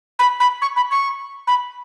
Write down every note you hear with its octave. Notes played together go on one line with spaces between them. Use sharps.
B5
B5
C#6
B5
C#6
B5